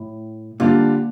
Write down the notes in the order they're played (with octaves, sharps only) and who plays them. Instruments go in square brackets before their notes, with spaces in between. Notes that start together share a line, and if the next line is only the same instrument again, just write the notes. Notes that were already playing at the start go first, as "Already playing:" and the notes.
Already playing: [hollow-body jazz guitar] A2
[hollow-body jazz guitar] A#2 [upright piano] D3 G3 D4 F4